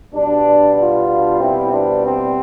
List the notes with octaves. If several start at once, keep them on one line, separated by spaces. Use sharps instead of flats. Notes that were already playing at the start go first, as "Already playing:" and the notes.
B2 G3 B3 D4
D4 F4
C4 E4
D4
C4